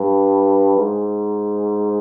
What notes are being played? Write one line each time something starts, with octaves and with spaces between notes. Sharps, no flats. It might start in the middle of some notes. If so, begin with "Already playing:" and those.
Already playing: G2
G#2